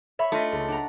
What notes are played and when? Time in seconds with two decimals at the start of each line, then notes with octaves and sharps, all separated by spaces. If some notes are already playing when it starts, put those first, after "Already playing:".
0.19 C#5 E5 B5
0.32 A3 D4 F4 D#5
0.52 C#2
0.68 D4 F#5 A#5